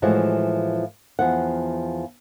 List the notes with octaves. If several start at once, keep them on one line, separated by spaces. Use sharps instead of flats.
A2 E3 F3 G#3 F#4
E2 F3 F#5